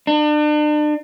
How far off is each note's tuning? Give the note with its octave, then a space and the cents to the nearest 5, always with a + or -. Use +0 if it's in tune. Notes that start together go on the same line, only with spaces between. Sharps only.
D4 +40